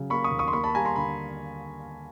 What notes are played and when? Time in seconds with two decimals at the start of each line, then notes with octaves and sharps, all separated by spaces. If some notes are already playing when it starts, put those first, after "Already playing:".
Already playing: C#3 F#3
0.10 A#3 B5 C#6
0.24 C#6 D#6
0.32 D#2
0.39 C#6 D#6
0.48 C6
0.53 A#3 B5 C#6
0.64 A5 B5
0.75 G3 G#5 A#5
0.85 A#5 C6
0.96 D3 B5